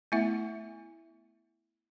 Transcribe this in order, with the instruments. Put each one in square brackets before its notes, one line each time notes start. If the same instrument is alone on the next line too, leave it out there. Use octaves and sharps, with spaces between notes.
[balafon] A3 B3 E4 E5